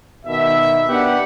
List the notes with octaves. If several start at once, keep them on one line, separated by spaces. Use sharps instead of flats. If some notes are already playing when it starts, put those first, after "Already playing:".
B2 D#3 E5
B3 D4 G4 F#5